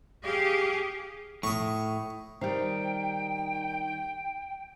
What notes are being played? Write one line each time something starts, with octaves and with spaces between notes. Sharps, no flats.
G4 G#4 F5
A2 C#6 D#6
D#3 G3 G4 C5 G5